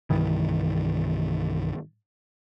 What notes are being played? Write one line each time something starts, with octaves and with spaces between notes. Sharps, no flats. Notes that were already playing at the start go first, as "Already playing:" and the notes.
C2 G2 D#3 E3